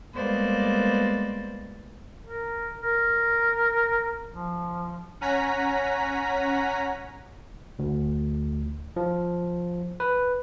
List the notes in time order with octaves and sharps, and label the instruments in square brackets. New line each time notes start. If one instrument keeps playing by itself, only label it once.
[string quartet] G3 G#3 A#3 B3 C5 D5
[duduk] A#4
A#4
F3
[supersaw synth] C#4 F#5 G#5 A#5 B6
[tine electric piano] D2
F3
B4